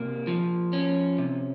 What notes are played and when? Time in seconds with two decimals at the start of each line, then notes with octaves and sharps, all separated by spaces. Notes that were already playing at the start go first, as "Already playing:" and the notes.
Already playing: C3 A#3
0.27 F3
0.73 C#4
1.18 C3